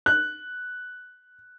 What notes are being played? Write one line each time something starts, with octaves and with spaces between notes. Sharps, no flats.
F#6